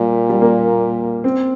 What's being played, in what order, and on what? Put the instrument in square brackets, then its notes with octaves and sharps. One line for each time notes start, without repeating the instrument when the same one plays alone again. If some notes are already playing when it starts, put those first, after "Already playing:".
Already playing: [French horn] A#2 [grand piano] G3
[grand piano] G3
A#3
C4